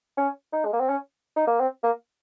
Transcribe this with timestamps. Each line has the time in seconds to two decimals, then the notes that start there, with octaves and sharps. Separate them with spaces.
0.18 C#4
0.53 D#4
0.65 G#3
0.73 A#3
0.80 C4
0.89 C#4
1.36 D#4
1.47 A#3
1.60 C4
1.84 A#3